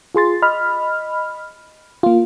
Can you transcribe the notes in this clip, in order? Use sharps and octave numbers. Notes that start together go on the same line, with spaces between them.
F4 G#4 C6 A6
D#5 B5 F6
A#3 F4